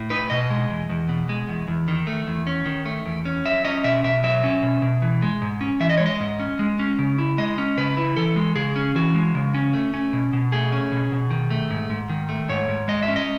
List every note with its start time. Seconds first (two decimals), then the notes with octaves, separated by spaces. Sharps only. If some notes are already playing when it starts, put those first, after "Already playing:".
Already playing: A2
0.10 D#4 B4
0.30 B2 D#5
0.50 G#3
0.70 E2
0.89 E2
1.09 B2
1.29 G#3
1.48 E2
1.68 E2
1.88 D#3
2.07 A3
2.27 E2
2.47 C#4
2.66 D#3
2.86 A3
3.06 E2
3.25 C#4
3.45 F#3 E5
3.65 C#4 D#5
3.84 B2 E5
4.04 B2 E5
4.24 F#3 E5
4.44 C#4
4.63 B2
4.82 B2
5.02 E3
5.22 G#3
5.42 G#2
5.61 C#4
5.80 E3 E5
5.89 D#5
5.98 G#3 C#5
6.06 D#5
6.20 G#2
6.40 C#4
6.59 G#3
6.79 C#4
6.99 C#3
7.18 E4
7.38 G#3 D#5
7.58 C#4
7.77 C#3 B4
7.97 E4
8.17 E3 A4
8.36 G#3
8.55 C#3 G#4
8.76 C#4
8.95 E3 F#4
9.15 G#3
9.35 C#3
9.54 C#4
9.73 A3
9.94 C#4
10.13 B2
10.33 B2
10.52 A3 G#4
10.72 C#4
10.92 B2
11.12 B2
11.30 D#3
11.50 A3
11.70 G#2
11.90 G#2
12.09 D#3
12.29 A3
12.49 G#2 C#5
12.68 G#2
12.88 G#3 D#5
13.03 E5
13.08 C#4
13.16 D#5